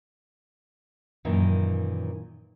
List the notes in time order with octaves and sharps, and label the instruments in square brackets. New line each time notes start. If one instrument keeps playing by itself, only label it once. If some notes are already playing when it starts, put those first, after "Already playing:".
[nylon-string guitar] F#2 A#2 D#3 E3